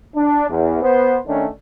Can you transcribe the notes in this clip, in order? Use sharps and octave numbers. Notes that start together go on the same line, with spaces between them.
D4
E2
B3 C5
D#3 A3 C#4 D4